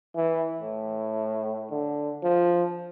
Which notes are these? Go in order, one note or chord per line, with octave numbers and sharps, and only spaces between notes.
E3
A2
D3
F3